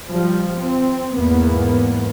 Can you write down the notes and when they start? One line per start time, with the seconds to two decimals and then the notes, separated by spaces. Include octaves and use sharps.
0.10 F3 G3
0.58 C4
1.16 E2 G#2 A#3 B3